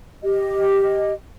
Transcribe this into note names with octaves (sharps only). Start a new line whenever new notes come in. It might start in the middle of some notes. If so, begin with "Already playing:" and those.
G4 D#5